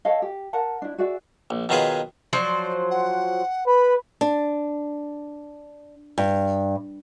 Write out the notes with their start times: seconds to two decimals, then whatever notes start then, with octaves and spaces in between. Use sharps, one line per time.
0.05 A4 C#5 D#5 F5
0.22 G4
0.53 A#4 F#5 A5
0.82 D4 E4
0.98 F#4 G#4 D5 E5
1.50 A#1
1.69 B2 D#3 F#3 F4 G#4 B4
2.33 F3 F#3 C5 D5
2.90 F#5
3.67 B4 B5
4.21 D4
6.18 G2